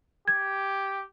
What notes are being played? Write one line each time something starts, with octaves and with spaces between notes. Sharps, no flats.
G4 G#6